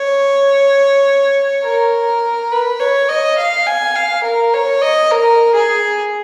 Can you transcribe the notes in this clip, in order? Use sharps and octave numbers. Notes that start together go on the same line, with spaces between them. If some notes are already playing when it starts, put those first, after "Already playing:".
Already playing: C#5
A#4
B4
C#5
D#5
F5
G#5
F5
A#4
C#5
D#5
A#4
G#4